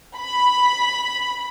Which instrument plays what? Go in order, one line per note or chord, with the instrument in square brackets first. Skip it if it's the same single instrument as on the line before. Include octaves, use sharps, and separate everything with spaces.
[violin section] B5